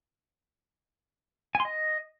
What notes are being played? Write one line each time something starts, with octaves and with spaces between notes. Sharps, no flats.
G#5
C6
D#5